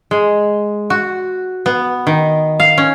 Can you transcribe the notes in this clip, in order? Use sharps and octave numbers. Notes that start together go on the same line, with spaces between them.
G#3
F#4
B3
D#3
F5
C#4